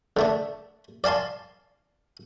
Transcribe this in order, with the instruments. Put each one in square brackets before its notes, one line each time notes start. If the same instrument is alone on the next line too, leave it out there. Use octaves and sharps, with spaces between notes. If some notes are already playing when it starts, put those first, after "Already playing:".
[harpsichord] D3 A3 D4
D5 F5 G#5 A5 C6